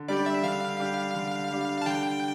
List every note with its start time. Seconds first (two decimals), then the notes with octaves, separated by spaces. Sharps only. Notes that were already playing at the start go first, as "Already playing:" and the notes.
Already playing: D3
0.08 G3 D4 G4 D5
0.26 E5
0.43 D3 F5
0.80 G3 D4 G4
1.15 D3
1.50 G3 D4 G4
1.82 A5
1.86 D3 G5